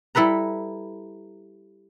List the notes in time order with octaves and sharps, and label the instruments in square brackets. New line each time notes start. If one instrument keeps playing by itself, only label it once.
[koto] G3 E4 A4 B4 A#5